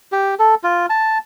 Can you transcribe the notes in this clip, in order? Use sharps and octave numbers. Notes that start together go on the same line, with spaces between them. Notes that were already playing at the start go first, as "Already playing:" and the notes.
G4
A4
F4
A5